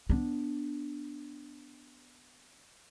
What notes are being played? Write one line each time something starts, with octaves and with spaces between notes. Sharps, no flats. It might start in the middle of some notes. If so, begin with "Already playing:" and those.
B3 D4